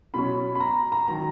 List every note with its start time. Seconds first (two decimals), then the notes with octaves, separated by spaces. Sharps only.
0.14 B2 F#3 C#4 B5
0.55 B5
0.60 A#5
0.92 A#5
1.08 D#3 F#3 A#5